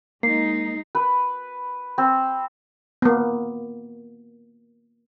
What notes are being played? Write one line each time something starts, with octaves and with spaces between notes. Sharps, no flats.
G#3 A#3 D#4 C7
B4
C4
A#3 B3